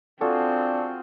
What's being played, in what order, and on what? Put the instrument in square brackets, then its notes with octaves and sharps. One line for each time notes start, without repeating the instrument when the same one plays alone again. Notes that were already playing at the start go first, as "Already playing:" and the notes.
[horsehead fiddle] C4 [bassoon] D4 [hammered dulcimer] F4 F#4 G#4 [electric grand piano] A4